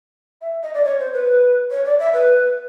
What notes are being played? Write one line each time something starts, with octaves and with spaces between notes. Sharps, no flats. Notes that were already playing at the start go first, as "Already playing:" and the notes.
E5
D#5
D5
C#5
C5
B4
C#5
D5
E5
B4